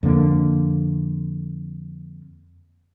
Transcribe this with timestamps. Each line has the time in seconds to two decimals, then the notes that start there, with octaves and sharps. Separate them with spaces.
0.03 F2 D3 A#3